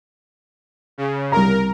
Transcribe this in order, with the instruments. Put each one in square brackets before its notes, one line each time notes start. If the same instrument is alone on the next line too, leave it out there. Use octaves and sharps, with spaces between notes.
[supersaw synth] C#3
[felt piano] C2 A#5 [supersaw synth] A#4